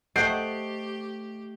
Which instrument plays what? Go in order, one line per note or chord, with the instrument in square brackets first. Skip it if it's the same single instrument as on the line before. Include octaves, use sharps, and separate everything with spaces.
[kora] A3 [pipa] C4 D#5 F#5 [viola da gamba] G4 [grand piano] G6 C7 D7